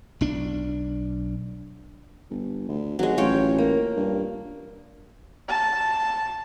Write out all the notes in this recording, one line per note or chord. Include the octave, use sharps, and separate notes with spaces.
B1 D4
G1
D2
G#1 F#3 G#3
A1 F4 C#5 G5
A#3
G2
A5